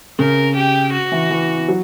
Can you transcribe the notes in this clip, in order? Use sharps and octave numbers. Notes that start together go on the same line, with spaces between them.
C#3 A#4
G4
F#4
E3
E3
F#3